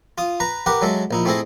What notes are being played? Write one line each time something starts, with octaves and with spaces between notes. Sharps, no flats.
F4 D#6
B4 A#5
G4 A#4 B4 F#5
F#3 G#3 A4 E5
A#1 D#4 E4
A3 C4 E4 G#4 A4 D#5